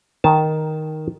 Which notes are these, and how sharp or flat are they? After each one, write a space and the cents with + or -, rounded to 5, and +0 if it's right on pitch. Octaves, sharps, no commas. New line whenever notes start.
D#3 +0 A5 -15